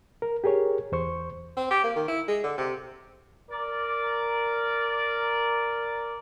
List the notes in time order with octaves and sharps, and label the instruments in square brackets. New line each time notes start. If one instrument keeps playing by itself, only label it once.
[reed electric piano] A#4
G4 G#4 A#4 C#5
E2 C5 C#6
[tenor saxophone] C4
G4
A#3
D#3
E4
G#3
D3
C3
[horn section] A#4 D5